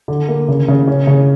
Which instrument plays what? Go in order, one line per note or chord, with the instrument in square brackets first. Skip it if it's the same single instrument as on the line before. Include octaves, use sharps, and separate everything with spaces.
[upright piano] D3
A#3
C#3
C#3
C#4
C#3